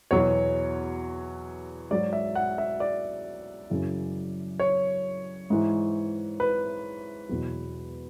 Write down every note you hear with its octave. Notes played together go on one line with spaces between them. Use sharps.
E2 B2 F#3 C#5
G#2 F#3 D5
E5
F#5
E5
D5
F#2 C#3 E3
C#5
G#2 E3
B4
E2 B2 F#3